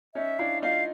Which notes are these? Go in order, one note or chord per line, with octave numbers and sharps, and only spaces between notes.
C#4 D#4 E5
D4 E4 F5
D#4 F4 F5